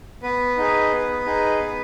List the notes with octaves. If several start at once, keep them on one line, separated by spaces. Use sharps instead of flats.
B3 B4
D#4 G#4
B3
D#4 G#4
B3